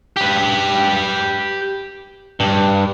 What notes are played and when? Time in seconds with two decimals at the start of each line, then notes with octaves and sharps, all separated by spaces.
0.17 G4 B4
2.40 G2